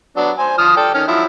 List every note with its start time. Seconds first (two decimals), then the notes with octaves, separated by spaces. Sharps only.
0.17 F#3 B3 D4
0.38 C5 G#5
0.58 F3 D#6 F6
0.77 A4 D5 G5
0.94 D#3 C#4 F6
1.08 F3 F#3 E4